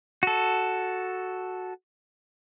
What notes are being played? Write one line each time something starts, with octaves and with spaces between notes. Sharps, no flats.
F#4 A4